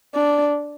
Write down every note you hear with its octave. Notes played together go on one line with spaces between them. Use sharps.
D4